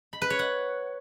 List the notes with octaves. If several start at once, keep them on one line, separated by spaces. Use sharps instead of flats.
B5
B4
C#5
F#5